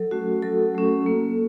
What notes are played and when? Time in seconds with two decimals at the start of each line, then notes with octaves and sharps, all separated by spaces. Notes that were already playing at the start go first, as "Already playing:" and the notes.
Already playing: F#3 A4
0.11 A3 C#4 F#4
0.42 F#3 A4
0.75 A3 C#4
1.06 A#3